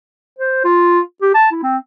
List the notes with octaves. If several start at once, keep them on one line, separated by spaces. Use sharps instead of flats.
C5
F4
G4
A5
E4
C4